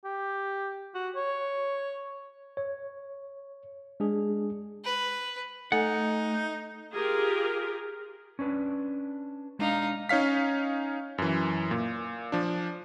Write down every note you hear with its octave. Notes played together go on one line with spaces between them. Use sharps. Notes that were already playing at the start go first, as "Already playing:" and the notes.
G4
F#4
C#5
C#5
G#3 D4 G#4
B4
A3 D#4 A4 F#5 G#5
F4 G4 G#4 A#4
C#4 D4 B4
G#3 D4 D#4 F5
C#4 D#4 C#5 F5 B6
F#2 E3
A#2
F3 D4